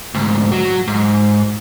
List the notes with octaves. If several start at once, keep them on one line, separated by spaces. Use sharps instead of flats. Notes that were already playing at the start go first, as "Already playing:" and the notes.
D2 G#2
F#3
G#2